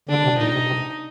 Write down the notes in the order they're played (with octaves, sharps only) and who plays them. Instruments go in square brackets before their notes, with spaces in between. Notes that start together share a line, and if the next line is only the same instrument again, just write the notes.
[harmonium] D3 [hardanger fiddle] D4
[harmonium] C3
[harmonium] A#2 [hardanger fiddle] D#4
[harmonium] C3
C3